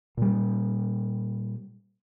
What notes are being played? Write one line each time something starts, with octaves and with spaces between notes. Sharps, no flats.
A#2 G3